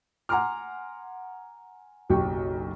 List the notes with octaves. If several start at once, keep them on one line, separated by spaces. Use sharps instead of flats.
F#5 G#5 A#5 C6 D6 F6
F#1 B1 F#3 G4 G5 C#6